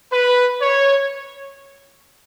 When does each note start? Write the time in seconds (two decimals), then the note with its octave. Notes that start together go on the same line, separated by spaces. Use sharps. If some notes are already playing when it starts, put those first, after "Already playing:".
0.11 B4
0.60 C#5